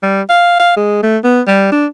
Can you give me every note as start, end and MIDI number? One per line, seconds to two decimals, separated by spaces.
0.02 0.22 55
0.29 0.55 77
0.59 0.72 77
0.77 0.99 56
1.03 1.17 57
1.24 1.41 59
1.47 1.71 55
1.72 1.86 62